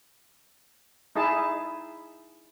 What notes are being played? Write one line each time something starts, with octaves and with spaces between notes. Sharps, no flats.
D#4 E4 G#4 A5